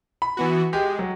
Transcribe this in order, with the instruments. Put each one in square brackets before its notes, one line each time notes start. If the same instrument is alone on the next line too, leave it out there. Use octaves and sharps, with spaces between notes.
[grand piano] B5
[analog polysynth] E3 B3 F#4
[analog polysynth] G#3 [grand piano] G4
[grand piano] F#3